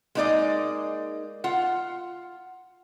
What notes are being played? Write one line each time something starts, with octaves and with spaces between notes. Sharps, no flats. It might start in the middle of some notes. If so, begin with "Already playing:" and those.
G#3 A#3 D#4 A4 D5 D#5
F4 F#5